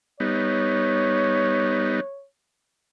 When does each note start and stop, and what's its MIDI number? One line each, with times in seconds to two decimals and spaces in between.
0.20 2.00 55
0.20 2.00 59
0.20 2.00 63
0.20 2.25 73